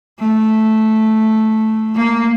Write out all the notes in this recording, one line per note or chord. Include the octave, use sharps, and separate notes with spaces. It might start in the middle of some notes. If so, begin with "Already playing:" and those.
A3
A#3